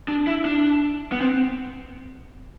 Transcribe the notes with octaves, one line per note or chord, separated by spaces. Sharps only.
D4
E4
D4
B3
C4